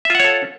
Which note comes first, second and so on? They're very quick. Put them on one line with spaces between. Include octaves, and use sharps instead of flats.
E5 F4 F#5 C#5 A4